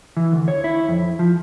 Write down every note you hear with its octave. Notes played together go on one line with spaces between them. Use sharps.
E3
D2
C#5
E4
F2
F3